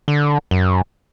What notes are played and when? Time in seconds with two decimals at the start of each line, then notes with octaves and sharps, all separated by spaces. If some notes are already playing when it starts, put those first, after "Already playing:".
0.08 D3
0.51 F#2